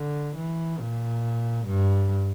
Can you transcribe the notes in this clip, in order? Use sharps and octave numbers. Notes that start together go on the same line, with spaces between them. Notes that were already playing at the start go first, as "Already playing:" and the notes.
Already playing: D3
E3
A#2
G2